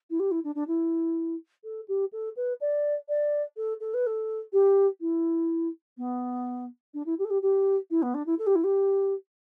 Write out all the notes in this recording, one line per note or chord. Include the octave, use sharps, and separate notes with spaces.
E4
G4
E4
D4
D4
E4
A4
G4
A4
B4
D5
D5
A4
A4
B4
A4
G4
E4
B3
D4
E4
G4
A4
G4
G4
E4
B3
D4
E4
A4
G4
E4
G4